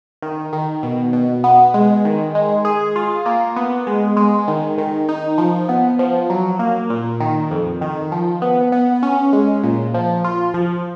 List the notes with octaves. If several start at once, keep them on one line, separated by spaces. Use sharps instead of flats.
D#3
D#3
B2
B2
B3
G#3
D#3
G#3
G#4
F4
A#3
B3
G#3
G#3
D#3
D#3
D#4
F3
B3
F3
F#3
A#3
A#2
D#3
F2
D#3
F3
B3
B3
C#4
G#3
A#2
F3
F4
F3